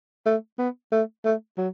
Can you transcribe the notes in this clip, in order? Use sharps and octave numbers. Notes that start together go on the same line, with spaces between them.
A3
B3
A3
A3
F#3